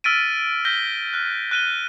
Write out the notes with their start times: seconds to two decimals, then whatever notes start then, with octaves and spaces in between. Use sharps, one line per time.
0.04 E6 F6 A6 B6 D7 D#7
0.65 E6 G6 A#6 B6 G7
1.13 F6 F#6
1.51 F#6 D#7 G7